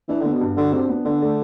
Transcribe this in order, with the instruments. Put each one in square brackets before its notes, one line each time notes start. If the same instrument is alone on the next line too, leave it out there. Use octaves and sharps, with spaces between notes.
[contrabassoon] E3 [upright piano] D4
[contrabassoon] D3 [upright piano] B3
[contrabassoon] B2
[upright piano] G2
[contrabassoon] D3 [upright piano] F#3
[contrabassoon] C3 [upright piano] D4
[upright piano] B3
[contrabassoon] D3 [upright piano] D4
[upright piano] A3